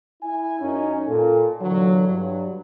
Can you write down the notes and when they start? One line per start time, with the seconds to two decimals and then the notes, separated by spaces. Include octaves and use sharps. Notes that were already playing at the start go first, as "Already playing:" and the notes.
0.23 E4 G#5
0.61 F#2 C#4 D#4
1.07 A#2 A4
1.60 A#2 D3 E3 F#3
2.06 G2 F#3